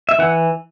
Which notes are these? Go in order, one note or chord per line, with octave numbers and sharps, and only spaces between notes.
E5
E3 F#5